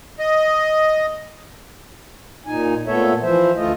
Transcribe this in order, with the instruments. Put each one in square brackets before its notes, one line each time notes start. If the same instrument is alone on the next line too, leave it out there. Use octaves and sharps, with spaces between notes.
[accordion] D#5
[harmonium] A#2 D#4 G#5
A#2 A3 B3 A4 C#5 E5
E3 F3 C5 E5
D2 A3 F4 D#5